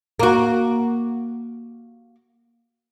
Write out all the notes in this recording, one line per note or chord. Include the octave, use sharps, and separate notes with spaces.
A#3 F#4